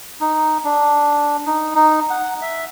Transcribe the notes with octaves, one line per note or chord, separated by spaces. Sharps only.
D#4
D4
D#4
D#4
F#5
E5